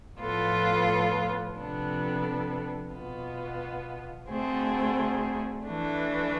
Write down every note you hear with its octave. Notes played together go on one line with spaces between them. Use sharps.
A2 F3 B3 F4 A4
C3 F3 B3 D4 A4
B2 B3 F4
D2 D3 A3 C4 G#4
E3 A3 D4